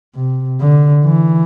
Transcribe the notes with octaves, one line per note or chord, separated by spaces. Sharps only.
C3
D3
E3